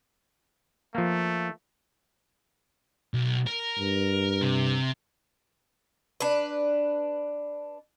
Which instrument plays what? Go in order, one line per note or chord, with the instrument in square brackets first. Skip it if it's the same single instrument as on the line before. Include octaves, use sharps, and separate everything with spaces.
[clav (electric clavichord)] F3 A#3 [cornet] A3
[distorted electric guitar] B1
A#4
[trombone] G2
[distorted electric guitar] C3
[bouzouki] D4 B4